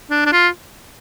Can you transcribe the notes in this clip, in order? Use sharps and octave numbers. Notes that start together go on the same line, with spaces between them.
D4
D4
F4